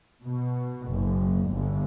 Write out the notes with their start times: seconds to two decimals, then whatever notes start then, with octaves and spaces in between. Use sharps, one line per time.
0.22 B2
0.88 F#1
1.49 G1